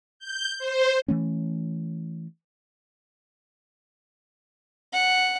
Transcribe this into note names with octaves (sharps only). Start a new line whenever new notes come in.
G6
C5
E3 A3 C#4
F#5